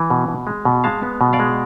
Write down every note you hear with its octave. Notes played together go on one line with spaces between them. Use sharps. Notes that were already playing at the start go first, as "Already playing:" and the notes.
Already playing: E3
B2
B2
G#3
B2
G#3 F5 A5
B3
B2
D5 F5
G#3